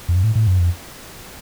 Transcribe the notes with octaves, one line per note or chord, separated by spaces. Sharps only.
F2
F#2
A2
A2
F#2
F2